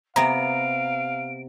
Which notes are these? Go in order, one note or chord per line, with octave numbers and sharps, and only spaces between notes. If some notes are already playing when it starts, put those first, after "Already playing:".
C3 B3 F5 A#5 D7